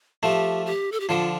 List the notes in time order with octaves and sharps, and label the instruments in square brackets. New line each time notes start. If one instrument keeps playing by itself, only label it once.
[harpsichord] F3 A3 [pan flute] G4
[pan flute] G4
A4
G4
[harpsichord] D3 F3 [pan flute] F4